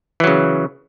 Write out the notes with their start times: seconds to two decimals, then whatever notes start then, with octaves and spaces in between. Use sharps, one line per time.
0.20 E3
0.24 F#3
0.27 C#3